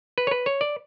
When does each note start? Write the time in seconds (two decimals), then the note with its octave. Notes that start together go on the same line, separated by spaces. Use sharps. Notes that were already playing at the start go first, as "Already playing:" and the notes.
0.18 B4
0.27 C#5
0.31 B4
0.46 C#5
0.61 D5